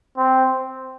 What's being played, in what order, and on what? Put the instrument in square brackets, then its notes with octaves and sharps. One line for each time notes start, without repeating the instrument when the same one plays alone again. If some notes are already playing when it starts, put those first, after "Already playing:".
[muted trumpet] C4